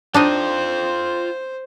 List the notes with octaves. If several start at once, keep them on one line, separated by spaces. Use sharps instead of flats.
D4 D#4 F4 C5 D#5 F5 G5